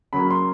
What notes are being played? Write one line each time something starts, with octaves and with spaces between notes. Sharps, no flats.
C#3 F#3 A#3 C#4 B5
C6